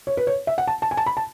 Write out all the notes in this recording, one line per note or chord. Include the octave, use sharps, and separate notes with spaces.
C#5
B4
C#5
E5
F#5
A5
A5
G#5
A5
B5
A5